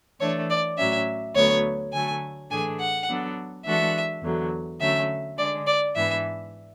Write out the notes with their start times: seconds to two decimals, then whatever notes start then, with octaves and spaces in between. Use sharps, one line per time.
0.20 E3 A3 D4 C#5
0.50 D5
0.78 A2 F#3 C#4 E5
1.35 D2 D3 F#3 B3 C#5
1.93 D3 F#3 A3 G#5
2.51 A2 E3 A3 D4 G#4 G#5
2.80 F#5
3.08 F#3 B3 D4 A4
3.66 E3 G#3 D4 F#4 A4 E5
4.23 E2 D3 F#3
4.81 D3 F#3 A3 C#4 E5
5.38 D3 G#3 D4 D5
5.67 D5
5.96 G#2 E3 B3 D4 E5